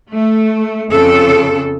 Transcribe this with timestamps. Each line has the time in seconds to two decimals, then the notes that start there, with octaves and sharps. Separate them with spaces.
0.12 A3
0.92 F2 C#3 A4